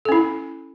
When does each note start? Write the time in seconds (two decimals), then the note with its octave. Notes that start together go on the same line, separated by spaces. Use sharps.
0.05 A4
0.09 C#4
0.12 E4